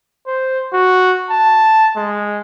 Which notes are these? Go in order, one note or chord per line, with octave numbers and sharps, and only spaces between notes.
C5
F#4
A5
G#3